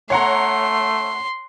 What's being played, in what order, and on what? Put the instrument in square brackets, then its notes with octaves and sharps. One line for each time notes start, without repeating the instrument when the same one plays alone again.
[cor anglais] A3 [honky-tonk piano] C#5 F#5 A#5 [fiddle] C6